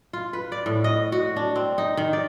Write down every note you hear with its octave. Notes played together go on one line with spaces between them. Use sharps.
F4
B4
D5
A2
D#5
F#4
D4
C4
D#4
D#3
D5